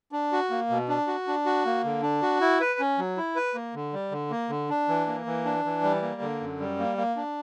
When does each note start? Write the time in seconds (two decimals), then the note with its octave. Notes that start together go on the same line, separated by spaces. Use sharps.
0.12 D4
0.32 F#4
0.50 A#3
0.70 B2
0.88 D4
1.07 F#4
1.27 D4
1.46 F#4
1.65 A#3
1.84 D3
2.02 D4
2.22 F#4
2.41 E4
2.61 B4
2.80 C#4
2.98 F#3
3.17 E4
3.36 B4
3.54 A#3
3.75 D3
3.93 G3
4.11 D3
4.31 A#3
4.50 D3
4.69 D4
4.89 E3
5.07 A#3
5.26 E3
5.45 D4
5.65 E3
5.83 G3
6.02 A#3
6.22 D3
6.41 F#2
6.60 G3
6.79 A#3
6.98 A#3
7.16 D4